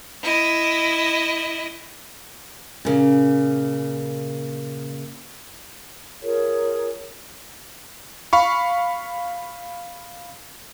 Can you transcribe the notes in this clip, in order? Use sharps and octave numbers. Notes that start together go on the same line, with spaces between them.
E4 D#5
A#2 C#3
F4 G#4 A#4 C#5
F5 B5 C#6